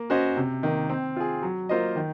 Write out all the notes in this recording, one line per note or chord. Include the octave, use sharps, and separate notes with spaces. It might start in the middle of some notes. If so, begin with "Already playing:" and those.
Already playing: A#3
C#4 F#4 C5 D#5
C3
D#3 A#3
C4
F4 G#4
F#3
A#3 F4 C5 D#5
D#3